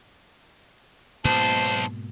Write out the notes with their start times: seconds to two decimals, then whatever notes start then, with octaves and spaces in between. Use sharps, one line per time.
1.25 B1 G#2 B2 A#3 C5 A5